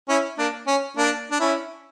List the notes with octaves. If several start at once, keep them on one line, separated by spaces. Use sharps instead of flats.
C#4 E4
A#3 D4
C#4
A#3 D4
D4
C#4 E4